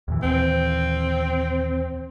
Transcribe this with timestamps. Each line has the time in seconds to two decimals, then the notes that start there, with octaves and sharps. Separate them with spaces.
0.08 D#2 A#2 E3
0.23 C4